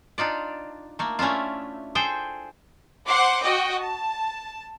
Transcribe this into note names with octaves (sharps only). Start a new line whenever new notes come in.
D4 D#4 F4 D5
A3 A#3
A3 C#4 D4 E4 F4
G#4 A4 C5 G5
C5 F#5 C6 D6
F#4 D#5 G5
A5